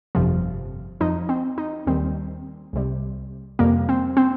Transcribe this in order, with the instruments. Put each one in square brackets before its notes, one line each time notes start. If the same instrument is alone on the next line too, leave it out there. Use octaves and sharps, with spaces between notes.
[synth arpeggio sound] G1 F2 C3 F3
F2 F3 D#4
C4
D#4
D#2 D#3 G3 C4
C2 C3 G3
F2 C3 G3 A#3
C4
C4